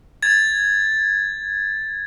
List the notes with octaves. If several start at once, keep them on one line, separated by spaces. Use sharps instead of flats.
G#6 A6